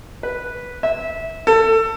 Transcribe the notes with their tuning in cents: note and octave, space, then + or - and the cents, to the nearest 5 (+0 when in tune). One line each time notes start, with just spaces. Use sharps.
B4 -5
E5 -20
A4 +25